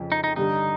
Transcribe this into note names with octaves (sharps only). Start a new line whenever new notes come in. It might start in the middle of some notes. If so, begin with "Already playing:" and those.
Already playing: F2 C#3 F3
D#4
D#4
G2 D3 G3 D#4